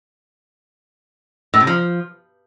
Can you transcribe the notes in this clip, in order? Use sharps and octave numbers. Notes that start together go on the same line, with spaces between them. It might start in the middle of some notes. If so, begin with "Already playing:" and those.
A2
C3
F3